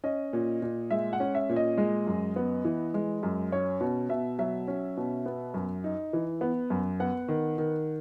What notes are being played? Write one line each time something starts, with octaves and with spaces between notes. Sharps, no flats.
C#4 D#5
A#2
A#2
G#3 E5
F#5
C#4
E5
A#2
D#5
G#3
F#2
B3
E3
G#3
F#2
C#4 C#5
B2
B2 E5
F#3 E5
C#4
B2
B3
F#2
D#4
E3
B3
F#2
B3 F#5
D#3
D#3